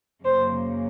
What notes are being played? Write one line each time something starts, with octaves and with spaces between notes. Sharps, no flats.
F#2 C#3 F#3 A#3 C5